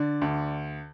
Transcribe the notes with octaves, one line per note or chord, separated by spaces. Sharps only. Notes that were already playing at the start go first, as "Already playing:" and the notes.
Already playing: D3 D5
D2